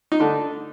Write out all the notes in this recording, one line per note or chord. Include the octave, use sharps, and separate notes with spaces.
D#4
D3 A3 D4